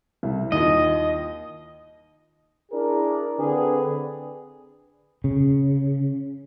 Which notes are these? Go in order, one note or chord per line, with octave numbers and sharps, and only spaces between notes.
C2
D#2 F4 D#5
D4 E4 G#4 A#4
D3 C4 D4 G#4 B4
C#3